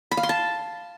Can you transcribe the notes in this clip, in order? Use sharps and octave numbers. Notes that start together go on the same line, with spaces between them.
B5
F5
C6
A5